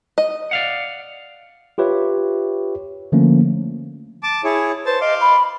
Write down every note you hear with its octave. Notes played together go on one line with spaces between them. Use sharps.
D#5
D5 F5 F#5
F4 G4 B4 C#5 E5
D3 F3 A3 A#3 C#4
A5 D6
E4 G#4 C#5
B4 C5 A5
D#5 F5 C6 D6
B5